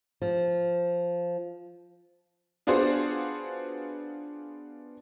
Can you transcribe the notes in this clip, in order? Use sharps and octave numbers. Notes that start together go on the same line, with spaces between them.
F3
B3 D4 F4 F#4 G#4 C5